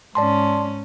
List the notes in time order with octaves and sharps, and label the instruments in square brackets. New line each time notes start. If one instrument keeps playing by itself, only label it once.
[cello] G#2 C#4 [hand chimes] D5 A5 C6